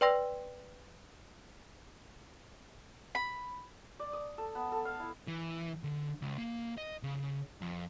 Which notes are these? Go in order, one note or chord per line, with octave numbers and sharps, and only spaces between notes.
B4 D5 G5 C6 E6 A#6
B5
D5
D#6
A4
B3
A4
F5
E4
E3
D3
C#2
A#3
D#5
C#3
F2